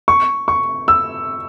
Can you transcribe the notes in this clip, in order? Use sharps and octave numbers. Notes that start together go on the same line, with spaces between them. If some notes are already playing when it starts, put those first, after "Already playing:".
C#6
C#6
E6